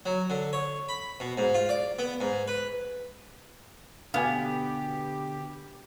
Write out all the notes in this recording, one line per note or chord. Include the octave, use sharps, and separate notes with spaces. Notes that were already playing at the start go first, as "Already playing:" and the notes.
F#3
D3
C#5
B5
B2
G#2
F4
D5
B3
G#2
B4
B2 D3 B3 G4 F5 F#5 G#5